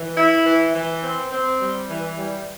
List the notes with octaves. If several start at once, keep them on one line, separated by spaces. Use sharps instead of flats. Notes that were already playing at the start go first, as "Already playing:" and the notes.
Already playing: E3
E4
E3
E3
C4
C4
G3
E3
G3